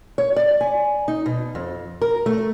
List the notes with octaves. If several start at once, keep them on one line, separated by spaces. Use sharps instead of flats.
C#5
D5
G#5
D#4
B2
F2
A#4
A3